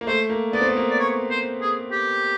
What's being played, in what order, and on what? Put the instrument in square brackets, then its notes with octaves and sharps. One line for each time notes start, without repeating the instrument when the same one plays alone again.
[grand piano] A#3
[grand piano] A3 [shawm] C5
[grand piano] A#3
[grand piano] B3 [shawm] D5
[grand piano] C4
B3
A#3
[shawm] D5
C#5
C5
G#4
G4